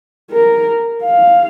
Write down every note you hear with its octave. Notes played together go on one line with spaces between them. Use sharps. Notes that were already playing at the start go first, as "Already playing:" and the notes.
A#4
F5